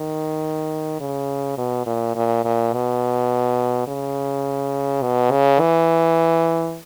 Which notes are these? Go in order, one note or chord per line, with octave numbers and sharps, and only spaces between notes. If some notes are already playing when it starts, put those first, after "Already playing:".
Already playing: D#3
C#3
B2
A#2
A#2
A#2
B2
C#3
B2
C#3
E3